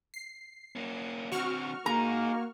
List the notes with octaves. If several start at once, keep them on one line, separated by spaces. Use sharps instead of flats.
C7
A#3 C#4
D3 C4 F#4 C#6 F6
A#3 D#4 G#4 A#5